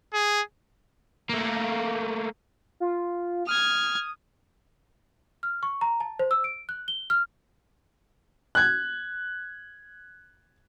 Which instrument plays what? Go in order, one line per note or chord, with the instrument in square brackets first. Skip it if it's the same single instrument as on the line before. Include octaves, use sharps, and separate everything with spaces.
[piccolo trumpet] G#4
[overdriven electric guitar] A3 A#3
[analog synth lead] F4
[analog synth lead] D#6 [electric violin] F6 G#6
[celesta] F6
C#6
A#5
A5
C5
E6
D7
F#6
G7
F6
[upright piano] F#6 G#6